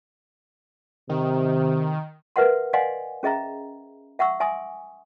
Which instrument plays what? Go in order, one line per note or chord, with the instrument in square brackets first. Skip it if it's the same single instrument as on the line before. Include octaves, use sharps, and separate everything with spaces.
[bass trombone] C3 [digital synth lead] D#3
[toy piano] A#4 B4 E5 F#5 C6
D5 D#5 F5 F#5 G#5 C6
C#4 G#4 D#5 E5 A#5
E5 F#5 C#6 E6
E5 G#5 C6 D#6